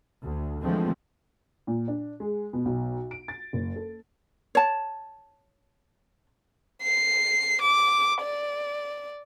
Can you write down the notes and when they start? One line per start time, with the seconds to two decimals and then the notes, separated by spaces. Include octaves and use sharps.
0.22 D2
0.62 D3 E3 F3 G#3 A3 C4
1.67 A#2
1.88 D4
2.20 G#3
2.53 B2
2.65 B1
3.11 D7
3.28 A6
3.53 F#1
3.76 A4
4.55 C#5 A5
6.83 C7
7.61 D6
8.22 D5